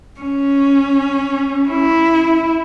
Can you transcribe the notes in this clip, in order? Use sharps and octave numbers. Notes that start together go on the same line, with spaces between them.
C#4
E4